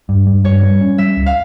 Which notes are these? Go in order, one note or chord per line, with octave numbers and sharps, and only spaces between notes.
G2
G2
G2 C#5
G3
C#4
G3 E5
C#2
F5